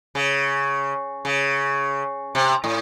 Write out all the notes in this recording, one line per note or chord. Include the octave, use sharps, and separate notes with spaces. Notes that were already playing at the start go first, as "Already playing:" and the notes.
C#3
C#3
C3
A2